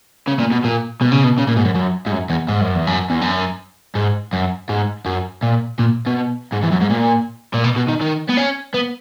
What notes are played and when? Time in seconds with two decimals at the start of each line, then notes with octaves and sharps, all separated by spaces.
0.27 C#3
0.39 A#2
0.51 B2
0.64 A#2
1.01 B2
1.12 C#3
1.23 B2
1.38 C#3
1.47 A#2
1.56 G#2
1.65 F#2
1.75 F#2
2.06 G#2
2.12 F#2
2.30 E2
2.48 G#2
2.61 F#2
2.75 E2
2.87 F#2
3.10 E2
3.21 F#2
3.95 G#2
4.33 F#2
4.69 G#2
5.06 F#2
5.43 A#2
5.79 A#2
6.07 B2
6.53 G#2
6.63 E2
6.72 F#2
6.81 G#2
6.90 A#2
7.54 A#2
7.64 B2
7.76 B2
7.89 D#3
8.01 D#3
8.29 B3
8.38 C#4
8.74 B3